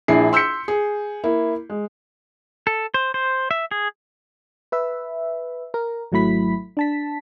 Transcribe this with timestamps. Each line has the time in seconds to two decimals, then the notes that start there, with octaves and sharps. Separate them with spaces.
0.08 A#1 D4 E4 G#4 C7
0.33 C6 E6 G6 B6 C#7
0.68 G#4
1.24 A#3 E4
1.70 G#3
2.67 A4
2.94 C5
3.14 C5
3.51 E5
3.71 G#4
4.72 B4 E5
5.74 A#4
6.12 G#1 F#3 A3 E4 B5 B6
6.77 D4 A5 B6